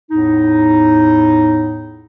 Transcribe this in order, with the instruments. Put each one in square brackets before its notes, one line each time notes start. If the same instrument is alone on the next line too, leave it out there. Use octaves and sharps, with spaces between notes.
[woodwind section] E2 A2 D#4